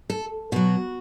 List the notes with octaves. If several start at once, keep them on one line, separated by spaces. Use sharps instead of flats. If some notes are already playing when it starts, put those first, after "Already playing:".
A4
B2 F#3 F#4